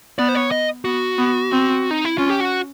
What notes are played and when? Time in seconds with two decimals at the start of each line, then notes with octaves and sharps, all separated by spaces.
0.18 B3 D5
0.29 C5
0.35 C#5
0.51 D#5
0.85 B3 F#4
1.18 B3
1.52 C4
1.91 D#4
2.05 E4
2.18 C#4 F4
2.30 G4
2.40 F#4